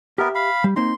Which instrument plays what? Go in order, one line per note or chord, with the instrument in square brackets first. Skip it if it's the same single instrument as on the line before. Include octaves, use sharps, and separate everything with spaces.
[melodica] B3 A#4 [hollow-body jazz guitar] G4 E5
[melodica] F5 B5
[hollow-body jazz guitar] G3
[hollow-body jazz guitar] A#3 C4 D#4 [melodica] C6